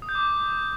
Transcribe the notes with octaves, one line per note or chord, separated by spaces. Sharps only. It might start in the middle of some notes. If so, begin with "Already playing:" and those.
D#6
G6
D6